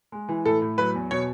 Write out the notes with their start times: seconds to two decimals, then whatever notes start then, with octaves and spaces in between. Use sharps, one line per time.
0.12 G#3
0.29 E3
0.45 A2 A4
0.62 A2
0.78 F#3 B4
0.95 E2
1.11 B2 C#5